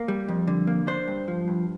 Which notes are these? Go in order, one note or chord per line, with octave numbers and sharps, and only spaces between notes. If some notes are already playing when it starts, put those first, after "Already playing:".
Already playing: A#3
G3
F2
D3
A#3
D4 C5
G2
F3
G2